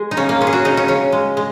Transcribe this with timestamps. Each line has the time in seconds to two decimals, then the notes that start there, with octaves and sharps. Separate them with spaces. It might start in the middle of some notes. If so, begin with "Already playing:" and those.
Already playing: G#3 G#4
0.11 D#4
0.17 C#3 C#4
0.29 A#3
0.41 G#3 C#4
0.47 G#4
0.53 F#4
0.65 C#3 D#4
0.77 C#4
0.88 C#3 C#4
1.12 G#3
1.37 G#3